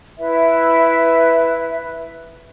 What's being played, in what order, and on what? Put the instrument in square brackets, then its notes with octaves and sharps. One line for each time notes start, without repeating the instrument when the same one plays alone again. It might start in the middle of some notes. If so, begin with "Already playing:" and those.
[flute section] E4 B4 E5